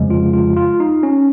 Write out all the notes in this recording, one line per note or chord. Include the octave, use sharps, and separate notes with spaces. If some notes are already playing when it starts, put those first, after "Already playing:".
Already playing: F2 C#3 F3 G#3
F4
F4
F4
D#4
C#4